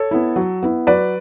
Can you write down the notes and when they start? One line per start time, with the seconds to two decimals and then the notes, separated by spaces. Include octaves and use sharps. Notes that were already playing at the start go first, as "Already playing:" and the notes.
Already playing: A4 C#5
0.11 B3 E4
0.36 F#3
0.63 B3 E4
0.87 F#3 B4 D5